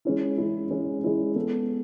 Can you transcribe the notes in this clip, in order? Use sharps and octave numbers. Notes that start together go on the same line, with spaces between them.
G#3 C#4 E4
G#3 C#4 E4
G#3 C#4 E4
G#3 C#4 E4
G#3 B3 E4 A4